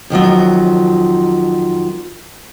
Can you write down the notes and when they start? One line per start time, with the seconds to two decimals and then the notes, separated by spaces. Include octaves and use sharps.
0.10 F2 D#3 F3 F#3